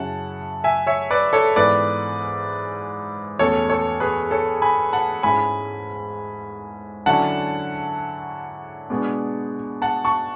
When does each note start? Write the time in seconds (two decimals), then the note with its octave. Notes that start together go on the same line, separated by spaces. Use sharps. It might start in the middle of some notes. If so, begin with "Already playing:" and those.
Already playing: F#2 C#3 F#3 C#4 E4 F#5 A5
0.64 E5 G#5
0.87 C#5 E5
1.11 B4 D5
1.33 A4 C#5
1.56 G#2 E3 B3 E4 B4 D5
3.39 E2 B2 A3 C#4 A4 C#5
3.70 A4 C#5
4.00 G#4 B4
4.31 A4 C#5
4.62 G#5 B5
4.93 F#5 A5
5.23 G#2 G#3 C#4 E4 G#5 B5
7.06 D3 F#3 C#4 E4 F#5 A5
8.90 B2 G#3 B3 D4
9.82 F#5 A5
10.05 A5 C#6